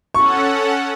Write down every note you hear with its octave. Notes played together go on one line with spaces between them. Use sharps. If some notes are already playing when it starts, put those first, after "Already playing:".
C#4 A4 F#5 C#6